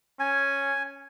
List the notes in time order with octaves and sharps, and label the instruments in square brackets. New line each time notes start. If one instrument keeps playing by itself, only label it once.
[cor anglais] C#4 [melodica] G#5